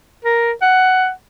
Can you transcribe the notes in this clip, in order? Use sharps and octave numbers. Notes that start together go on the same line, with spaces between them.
A#4
F#5